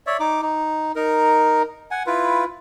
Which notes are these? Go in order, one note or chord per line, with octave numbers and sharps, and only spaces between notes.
C#5 D5 E5
D#4 D6
D#4
D#4 A#4
F#5 G#5
E4 F4 B4